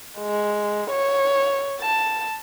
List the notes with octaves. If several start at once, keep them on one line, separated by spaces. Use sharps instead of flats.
G#3
C#5
A5